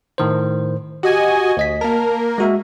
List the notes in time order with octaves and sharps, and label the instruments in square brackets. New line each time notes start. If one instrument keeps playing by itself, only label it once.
[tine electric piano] A2 D#3 C5
[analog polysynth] F#4 D#5 G#5 [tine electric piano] G4
[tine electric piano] D2 D#5 B6
[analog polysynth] A#3 A#4 [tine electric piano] A5
[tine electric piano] G#3 F#4 E5